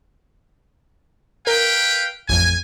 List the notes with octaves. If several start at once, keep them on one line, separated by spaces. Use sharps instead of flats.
A#4 B4 F5 G5
A1 F2 G#5